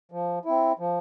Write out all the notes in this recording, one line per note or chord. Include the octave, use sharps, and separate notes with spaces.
F3
C4 E4
F3